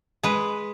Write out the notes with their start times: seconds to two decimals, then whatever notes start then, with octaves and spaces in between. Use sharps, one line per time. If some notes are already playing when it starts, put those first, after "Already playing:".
0.23 G#3 B4